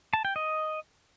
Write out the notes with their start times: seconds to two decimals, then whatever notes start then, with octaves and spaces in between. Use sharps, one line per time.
0.13 A5
0.25 G5
0.36 D#5